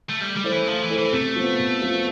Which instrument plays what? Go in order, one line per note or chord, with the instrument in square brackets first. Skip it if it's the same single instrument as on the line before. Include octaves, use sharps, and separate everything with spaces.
[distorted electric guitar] A3
[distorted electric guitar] G3 [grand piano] A3
[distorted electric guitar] G3
[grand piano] E4 A4 C5
[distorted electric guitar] E3
[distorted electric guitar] F3 [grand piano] A3
[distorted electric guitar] E3
[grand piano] E4 A4 C5
[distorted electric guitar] E3
[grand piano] C3 [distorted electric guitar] A3
[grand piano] F3 B3
C3
F3 B3